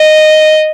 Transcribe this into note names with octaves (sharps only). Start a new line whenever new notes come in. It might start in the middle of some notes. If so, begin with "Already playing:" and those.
Already playing: D#5